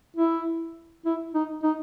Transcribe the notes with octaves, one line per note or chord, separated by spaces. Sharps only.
E4
E4
D#4
D#4